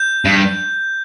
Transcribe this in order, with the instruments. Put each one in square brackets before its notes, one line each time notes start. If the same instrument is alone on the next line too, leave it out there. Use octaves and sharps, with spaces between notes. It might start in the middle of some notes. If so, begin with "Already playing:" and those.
Already playing: [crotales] G6
[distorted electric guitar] G2